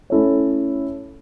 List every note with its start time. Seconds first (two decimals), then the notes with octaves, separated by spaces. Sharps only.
0.10 A3 C#4 E4 A4 C#5